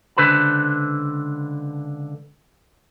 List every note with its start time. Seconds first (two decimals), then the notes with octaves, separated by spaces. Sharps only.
0.17 C#2 D3 B4 C5 A5 B5